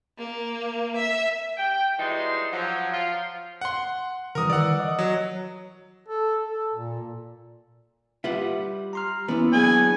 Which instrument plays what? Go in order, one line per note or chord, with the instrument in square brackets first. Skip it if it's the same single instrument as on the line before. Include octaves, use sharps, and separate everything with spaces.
[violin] A#3
E5
[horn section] G5
E3 G3 G#3 D#4 F#4 C6
F3 F#3
F3 F4
[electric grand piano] F#5 C6
[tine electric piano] D3 E3 G3 [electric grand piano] A#4 D#6
[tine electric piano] D#3 E3 E6 [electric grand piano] D5 F#5
[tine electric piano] D#5 D#6
[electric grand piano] F#3
[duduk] A4
A4
A#2
[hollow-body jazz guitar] G3 B4 E5 [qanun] F4 F#5
[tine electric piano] A#5 C6 F6
[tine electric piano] E3 C#4 [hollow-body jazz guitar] B3 [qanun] E4 D5
[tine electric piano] F#3 D4 G#4 [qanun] B4 C#5 F#5 [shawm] G#5